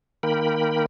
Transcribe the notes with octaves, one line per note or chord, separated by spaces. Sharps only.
D#3 A#3 A#4 G5 B5